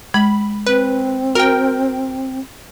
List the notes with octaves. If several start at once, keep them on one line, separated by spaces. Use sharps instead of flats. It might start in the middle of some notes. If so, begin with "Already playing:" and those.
G#3 B5
C4 B4
F#4 A#4 G5